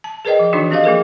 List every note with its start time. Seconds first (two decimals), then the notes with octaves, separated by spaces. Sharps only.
0.04 A5
0.25 G#4 A#4 B4 D5 D#5 G5
0.39 F3
0.53 D#3 E3 D4 D#4 F#4
0.71 C4 G4 A4 D#5 F5
0.84 F3 A#3 G#4 A#4